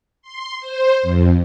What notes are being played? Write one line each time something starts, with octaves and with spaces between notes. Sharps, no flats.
C6
C5
F2